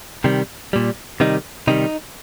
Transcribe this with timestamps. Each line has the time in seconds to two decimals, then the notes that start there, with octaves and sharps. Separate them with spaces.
0.24 C3 D#3 G3
0.73 A#2 G3
1.20 C3 D#3 G3 D#4
1.67 C3 D#3 G3 D#4